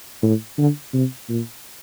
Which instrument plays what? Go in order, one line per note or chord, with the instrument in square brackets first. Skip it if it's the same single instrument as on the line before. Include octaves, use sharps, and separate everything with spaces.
[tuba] A2
D3
C3
A#2